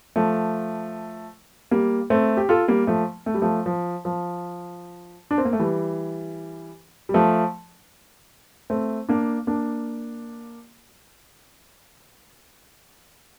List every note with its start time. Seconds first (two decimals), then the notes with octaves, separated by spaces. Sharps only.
0.16 F3 A3
1.71 G3 A#3
2.10 A3 C4
2.37 G4
2.49 F4 A4
2.68 G3 A#3
2.87 F3 A3
3.26 A3
3.34 G3
3.42 F3 A3
3.66 F3
4.05 F3
5.31 D4
5.38 C4
5.45 A#3
5.53 A3
5.60 E3 G3
7.09 G3
7.14 F3 A3
8.70 A3 C4
9.09 A#3 D4
9.47 A#3 D4